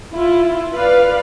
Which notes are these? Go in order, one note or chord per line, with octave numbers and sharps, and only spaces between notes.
E4 F4
B4 D5 F5